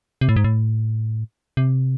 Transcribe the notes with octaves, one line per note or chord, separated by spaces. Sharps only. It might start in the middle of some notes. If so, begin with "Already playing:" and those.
C3
A2
G#2
A2
C3